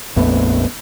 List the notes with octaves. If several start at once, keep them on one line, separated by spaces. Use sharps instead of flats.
A#1 F2 A3 B3